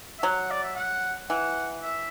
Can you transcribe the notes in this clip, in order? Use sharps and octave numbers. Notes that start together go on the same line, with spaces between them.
E5
F#3 F#5
D5
E5
F#5
E3 F#5
E5